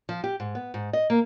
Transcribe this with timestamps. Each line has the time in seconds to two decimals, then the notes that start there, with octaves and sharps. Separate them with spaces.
0.09 F3
0.24 G4
0.40 G#2
0.55 B3
0.74 G#2
0.93 D#5
1.10 A#3